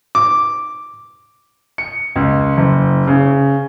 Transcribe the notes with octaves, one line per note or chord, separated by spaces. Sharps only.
D6
C#7
C#2
F#1
C#3